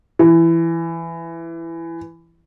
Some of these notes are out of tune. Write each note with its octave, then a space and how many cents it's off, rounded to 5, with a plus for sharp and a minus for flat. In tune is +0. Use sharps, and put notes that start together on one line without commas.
E3 +15